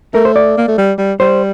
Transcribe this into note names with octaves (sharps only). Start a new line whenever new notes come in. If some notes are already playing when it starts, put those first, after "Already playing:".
A3 A#4
C5
D5
A#3
A3
G3
G3
G3 C5